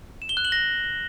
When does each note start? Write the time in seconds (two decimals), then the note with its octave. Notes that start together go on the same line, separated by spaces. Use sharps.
0.22 E7
0.29 G7
0.37 F#6
0.45 F#7
0.52 A#6